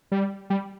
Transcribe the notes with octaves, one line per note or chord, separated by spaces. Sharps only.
G3
G3